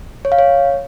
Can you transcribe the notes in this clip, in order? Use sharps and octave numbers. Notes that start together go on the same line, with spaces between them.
C#5
F5
C#5